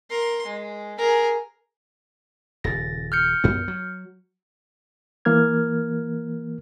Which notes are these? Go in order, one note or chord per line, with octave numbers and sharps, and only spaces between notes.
A#4 C6
G#3
G#4 A#4
D#1 C#3 A6 A#6
F6 G6 C#7
A#1 F#2 B3
F#3
E3 A#3 A#4 F6 G#6